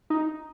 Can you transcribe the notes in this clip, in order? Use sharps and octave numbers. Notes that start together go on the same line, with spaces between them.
D#4